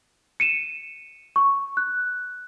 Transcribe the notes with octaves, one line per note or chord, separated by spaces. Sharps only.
C#7 D#7 E7
C#6
F#6